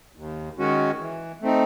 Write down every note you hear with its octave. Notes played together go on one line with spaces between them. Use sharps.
D#2
D#3 G#3 C#4 F#4
E3
A3 C4 D#4